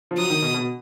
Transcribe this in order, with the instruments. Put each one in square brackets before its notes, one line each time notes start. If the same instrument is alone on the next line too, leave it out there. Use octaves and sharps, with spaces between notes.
[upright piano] F3
[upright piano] F#3 [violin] D#6
[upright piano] D#3
B2
B2